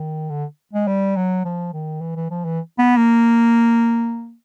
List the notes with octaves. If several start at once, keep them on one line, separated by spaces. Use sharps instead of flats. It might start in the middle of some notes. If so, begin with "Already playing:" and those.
Already playing: D#3
D3
G#3
G3
F#3
F3
D#3
E3
E3
F3
E3
B3
A#3